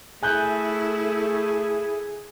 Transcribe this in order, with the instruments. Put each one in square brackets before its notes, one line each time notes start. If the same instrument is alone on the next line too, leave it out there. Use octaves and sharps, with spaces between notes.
[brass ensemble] A3 [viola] E4 A4 [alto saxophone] G#4 [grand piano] G#5 F#6 G6